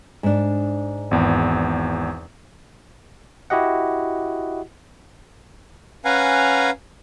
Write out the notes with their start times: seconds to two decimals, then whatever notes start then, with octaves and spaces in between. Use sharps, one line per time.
0.23 G#2 D4
1.11 G#1 E2
3.50 E4 F#4 G4 D#5 F#5
6.05 C#4 B4 F5 F#5 G#5 A#5